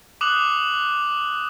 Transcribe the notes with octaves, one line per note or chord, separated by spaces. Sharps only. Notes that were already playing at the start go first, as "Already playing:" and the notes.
D6 D#6 F#6 F#7